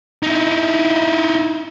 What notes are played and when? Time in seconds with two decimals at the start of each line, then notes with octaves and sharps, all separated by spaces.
0.23 D#4 E4